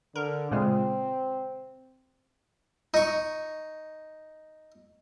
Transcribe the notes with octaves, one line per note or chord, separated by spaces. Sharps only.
D3 A#4
A#2 C#3 G#3 C4
D#4 C#6